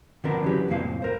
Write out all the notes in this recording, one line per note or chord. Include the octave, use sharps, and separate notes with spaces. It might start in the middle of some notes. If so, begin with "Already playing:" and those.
D3 F3 A#3 B3 D4 A#4
C#3 E3 F#3 G4 B4
C2 F2 A2 F3 A#3 F5
A#4 C5